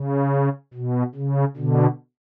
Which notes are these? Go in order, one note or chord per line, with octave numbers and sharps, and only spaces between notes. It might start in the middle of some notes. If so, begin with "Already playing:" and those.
Already playing: C#3
B2
C#3
B2 D3